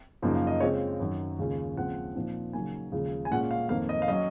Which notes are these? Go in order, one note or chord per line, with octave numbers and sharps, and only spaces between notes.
F#2 C#3 F3 A#3 D#4
F5
D#5
C#3 G#3 C4 F4 C#5
F#2 D#3 F#3
D#2 C#3 G#3 C#4 F4
D#2 C#3 F3 G#3 C4 F#5
A#2 F3 C4 D#4
C#3 F#3 A#3 D#4 G#5
D#2 C#3 F3 G#3
G#5
A#2 G#3 C#4 F4 F#5
F5
F2 D#3 A#3 F5
D#5
F5
F#3 C#4 D#5